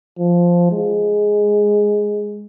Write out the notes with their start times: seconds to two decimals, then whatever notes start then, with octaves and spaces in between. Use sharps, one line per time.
0.19 F3
0.72 G#3